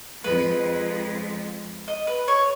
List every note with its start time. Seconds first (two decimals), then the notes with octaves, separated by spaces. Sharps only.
0.24 F2 F3 G#3 B4
1.88 D#5
2.07 B4
2.28 C#5